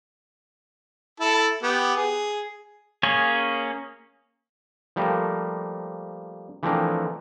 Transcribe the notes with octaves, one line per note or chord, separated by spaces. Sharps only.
E4 A4 A5
B3 G4
G#4
A#3 C#4 G#4 C#5
F3 G3 A3 A#3 A#4 C5
E3 F3 A3 C4 D4 A#4